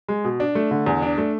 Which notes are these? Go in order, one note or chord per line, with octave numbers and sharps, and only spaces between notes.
G#3
B2
D4
A3
D3
E2
D4
A3